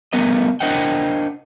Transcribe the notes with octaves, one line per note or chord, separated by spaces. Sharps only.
G3 A3 B3 A#4 D#5
D4 A#4 C5 D#5 F#5 G5